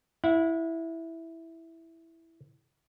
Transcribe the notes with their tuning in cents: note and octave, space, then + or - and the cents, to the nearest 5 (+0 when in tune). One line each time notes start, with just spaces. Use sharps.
E4 -5 F#5 -35